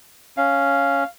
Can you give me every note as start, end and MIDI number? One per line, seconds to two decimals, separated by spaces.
0.37 1.04 61
0.37 1.05 77